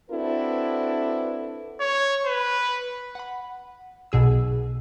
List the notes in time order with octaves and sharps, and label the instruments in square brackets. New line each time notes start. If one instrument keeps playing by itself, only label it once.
[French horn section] C4 D4 E4 F#4 A4 B4
[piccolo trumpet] C#5
B4
[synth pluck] F#5 B5
B1 B2 G#4 E6